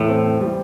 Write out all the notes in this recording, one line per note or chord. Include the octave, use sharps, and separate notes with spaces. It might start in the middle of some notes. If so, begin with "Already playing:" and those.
Already playing: E2 A2
C4
C4
G3